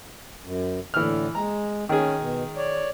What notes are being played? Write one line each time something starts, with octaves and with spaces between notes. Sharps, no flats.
F#2
A2 D3 E3 F6
G#3 A#5
D#3 C#4 G#4
B2
C#5 D5